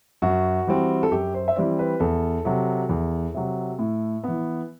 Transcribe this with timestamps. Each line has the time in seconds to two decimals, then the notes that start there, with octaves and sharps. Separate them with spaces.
0.22 F#2 F#4
0.67 E3 G3 C4
1.03 A4
1.12 F#2 G4
1.34 C5
1.48 E5
1.56 E3 G3 C4 D5
1.79 B4
2.00 E2 A4
2.45 C3 F#3
2.89 E2
3.34 C3 F#3
3.79 A2
4.24 E3 B3